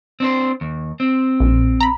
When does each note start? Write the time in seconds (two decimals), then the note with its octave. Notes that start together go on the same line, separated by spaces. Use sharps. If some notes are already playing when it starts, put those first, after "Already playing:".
0.20 C4 D4 C5
0.61 D#2
1.00 C4
1.40 A#1
1.80 A#5 B5